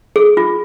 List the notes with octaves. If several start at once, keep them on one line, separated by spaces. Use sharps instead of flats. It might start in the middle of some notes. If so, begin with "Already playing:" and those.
G#4
F4